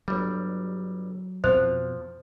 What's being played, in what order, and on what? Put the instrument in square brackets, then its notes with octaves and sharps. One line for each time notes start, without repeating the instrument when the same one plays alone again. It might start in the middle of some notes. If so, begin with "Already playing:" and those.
[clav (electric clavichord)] G1 G3 [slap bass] F#3
[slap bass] F2 B2 C4 [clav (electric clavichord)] F3 [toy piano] C5